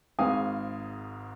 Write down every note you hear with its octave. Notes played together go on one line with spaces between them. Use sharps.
G#1 G#2 F5 G#5 D#6